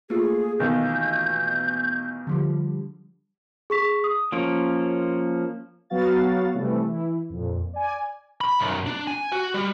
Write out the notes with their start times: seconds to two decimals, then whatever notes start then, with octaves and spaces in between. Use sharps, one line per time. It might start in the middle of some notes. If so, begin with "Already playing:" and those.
0.10 A3 A#3 F4 G#4
0.60 B1 B2 D#3 E3 G6
2.27 D3 F3 G3
3.70 G#4 C#6 B6
4.04 D#6
4.32 F3 A#3 C#4 D7
5.90 F#3 B3 F#4 F5 A6
6.54 C3 E3 G3 A3
6.83 E3 E4
7.29 F2 A#2
7.73 D5 G#5
8.41 B5
8.59 B1 F#2
8.86 D4
9.07 G#5
9.32 F#4
9.54 G3